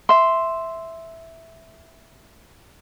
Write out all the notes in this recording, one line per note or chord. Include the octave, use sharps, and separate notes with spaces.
E5 C6